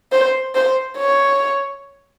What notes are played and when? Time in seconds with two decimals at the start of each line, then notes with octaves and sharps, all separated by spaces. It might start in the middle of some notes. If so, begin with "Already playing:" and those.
0.12 C5
0.55 C5
0.98 C#5